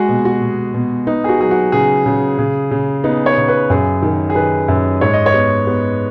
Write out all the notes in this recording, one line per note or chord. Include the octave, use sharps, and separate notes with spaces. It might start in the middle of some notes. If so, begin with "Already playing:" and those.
Already playing: G#3 F#4 G#4
B2
F#4
B2
B2
B3 D#4
G#4
F#4
F#3 G#4
F#4
C#3 G#4
C#3
C#3
C#3
B3 D#4
C#5
C#3
B4
F#2 G#4
D#3
G#4
D#3 B4
F#2
G#2 C#5
D#5
C#5
B3
B3